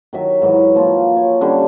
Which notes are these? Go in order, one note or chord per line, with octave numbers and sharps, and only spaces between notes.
D#3 F#3 E5
G#2 E3 F#3
F3 A#3 F4
C#5
D3 G3 C#4 C#6